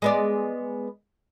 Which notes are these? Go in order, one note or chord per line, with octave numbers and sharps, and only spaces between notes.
G#3 B3 D5